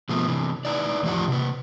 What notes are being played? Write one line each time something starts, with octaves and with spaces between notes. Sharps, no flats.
B2 F3 A3 B3 C4
C3 E3
D#4 E4 B4 D5
E2 A2 D#3 F3 G4 F#5
C3 B4